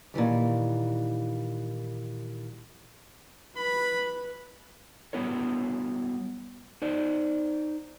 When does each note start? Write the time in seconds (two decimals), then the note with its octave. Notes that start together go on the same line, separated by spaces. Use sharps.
0.14 A#2 D#3 E3 G3
3.57 B4 B5
5.13 F#3 G3 B3 E4 A#4 C#5
6.82 D#4 C5 D5